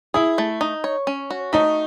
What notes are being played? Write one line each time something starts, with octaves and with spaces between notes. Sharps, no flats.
E4 G#4
A3
D#4
C#5
C#4
F#4
A3 D#4